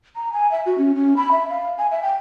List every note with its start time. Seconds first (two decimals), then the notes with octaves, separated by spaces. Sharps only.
0.16 A#5
0.33 G#5
0.51 E5
0.66 F#4
0.78 C#4
0.95 C#4
1.17 B5
1.32 E5
1.50 F5
1.78 G#5
1.91 E5
2.03 G5